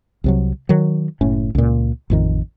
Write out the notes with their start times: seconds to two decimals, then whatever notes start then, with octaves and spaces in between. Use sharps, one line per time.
0.24 C2 C3 F#3
0.69 D#3 F#3
1.21 F#1 A2 C#4
1.55 C#2 A#2
2.10 A1 F2 D#3